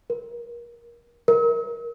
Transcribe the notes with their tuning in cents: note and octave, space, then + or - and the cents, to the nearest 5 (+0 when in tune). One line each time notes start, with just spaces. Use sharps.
A#4 +25
A#4 +10